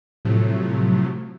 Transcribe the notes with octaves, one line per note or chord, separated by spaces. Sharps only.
A2 C3 F3 F#3 A3